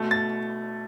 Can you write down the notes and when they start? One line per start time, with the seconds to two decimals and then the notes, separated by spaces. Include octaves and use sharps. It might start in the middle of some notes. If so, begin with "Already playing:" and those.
Already playing: B2 A3
0.11 A6